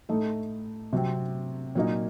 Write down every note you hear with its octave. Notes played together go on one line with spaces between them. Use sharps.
A2 A3 D#4 A4
C3 F#3 C4
A#2 F#3 A#3 D#4